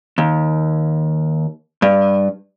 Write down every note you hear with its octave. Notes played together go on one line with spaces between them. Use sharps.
D#2
G2